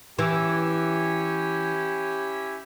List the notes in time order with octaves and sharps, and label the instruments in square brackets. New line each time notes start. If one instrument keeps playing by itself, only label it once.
[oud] E3 [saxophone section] C#4 E4 G4